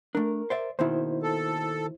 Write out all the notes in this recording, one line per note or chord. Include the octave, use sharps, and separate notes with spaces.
A3 D4 A#4
C5 D5 E5
D#2 B2 D#3 E4 C5
A4